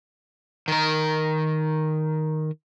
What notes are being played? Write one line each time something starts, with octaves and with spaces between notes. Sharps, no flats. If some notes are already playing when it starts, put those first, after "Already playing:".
D#3 A#4